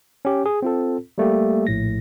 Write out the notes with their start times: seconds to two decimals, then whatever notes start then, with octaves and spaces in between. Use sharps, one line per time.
0.25 C#4 G4
0.46 G#4
0.62 C4 F4 A4
1.18 G3 A3 A#3 G4
1.67 A#1 A2 A#6